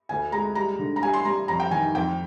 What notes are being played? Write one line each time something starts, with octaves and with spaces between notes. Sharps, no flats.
D2 G#5
G#3 A#5
G3 A#5
D3
A#5
G3 G#5
C6
G3 A#5
F2 A#5
G5
D#3 G#5
F2 G5